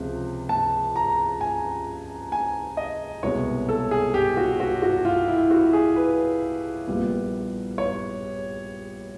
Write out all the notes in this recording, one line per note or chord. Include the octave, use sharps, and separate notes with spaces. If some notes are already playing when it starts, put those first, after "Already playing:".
Already playing: C#2 C3 F3
A5
A#5
G#5
G#5
D#5
C2 B2 G#3 B3 C#5
A4
G#4
G4
F#4
F#4
F#4
F4
E4
F#4
G#4
B4
A#1 A#2 G3 B3
C#5